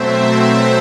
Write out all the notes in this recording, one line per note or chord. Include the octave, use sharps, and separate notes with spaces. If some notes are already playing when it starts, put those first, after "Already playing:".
Already playing: B2 F#3 A3 C4 C5 E5